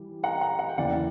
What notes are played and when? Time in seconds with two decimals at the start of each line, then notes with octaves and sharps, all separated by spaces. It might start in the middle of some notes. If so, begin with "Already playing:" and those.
Already playing: E3 G3
0.23 F#5 A#5
0.41 F#5 A#5
0.59 F#5
0.69 G5
0.77 E2 C#3 E3 A#3 D5 F#5